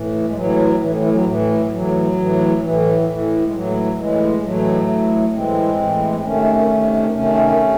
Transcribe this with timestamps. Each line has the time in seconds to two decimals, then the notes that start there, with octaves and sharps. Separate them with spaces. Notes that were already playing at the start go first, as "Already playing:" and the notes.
Already playing: A2 E3
0.28 G#3
0.35 A2 E3 F#3
0.80 A2 E3
0.96 E3
1.11 F#3
1.25 A2 E3
1.71 A2 E3 F#3
2.17 A2 E3
2.62 A2 E3
3.07 A2 E3
3.43 G#3
3.52 A2 E3 F#3
3.98 A2 E3 G#3
4.43 A2 E3 F#3 A3
4.89 A2 E3
5.34 A2 E3 G#3 C4
5.79 A2 E3
5.98 A3
6.11 C4
6.24 C3 D#3 A3 C#4
6.70 C3 D#3
7.15 C3 D#3 A3 C#4
7.61 C3